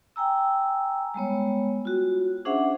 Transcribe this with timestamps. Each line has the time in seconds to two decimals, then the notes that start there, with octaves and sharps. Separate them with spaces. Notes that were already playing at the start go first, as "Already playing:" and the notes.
0.16 G5 G#5 A#5 E6
1.14 G3 G#3 B3 C#5
1.85 F4 F#4
2.45 C#4 D4 G#4 C5 E5 F#5